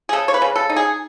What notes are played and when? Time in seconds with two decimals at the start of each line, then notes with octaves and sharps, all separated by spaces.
0.09 G#4
0.13 C#3 A4
0.28 C#5
0.34 B4
0.42 C#3
0.56 A4
0.70 D#4
0.76 G#4